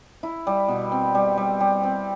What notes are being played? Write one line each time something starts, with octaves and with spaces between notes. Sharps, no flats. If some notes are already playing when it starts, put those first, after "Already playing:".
E4
G3
B2
C4
G3
G3
G3
C4